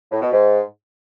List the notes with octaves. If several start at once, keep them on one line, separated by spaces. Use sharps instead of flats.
A2
B2
G#2